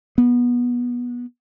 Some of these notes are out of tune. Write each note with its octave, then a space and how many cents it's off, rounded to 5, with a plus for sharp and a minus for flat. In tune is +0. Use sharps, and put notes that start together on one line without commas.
B3 -20